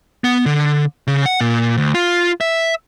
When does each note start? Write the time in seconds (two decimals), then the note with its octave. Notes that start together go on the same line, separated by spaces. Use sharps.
0.24 B3
0.46 D3
1.07 C#3
1.26 F#5
1.41 A#2
1.77 D2
1.95 F4
2.41 E5